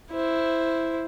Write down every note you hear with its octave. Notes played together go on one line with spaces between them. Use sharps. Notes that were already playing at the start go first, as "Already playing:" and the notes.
E4 C5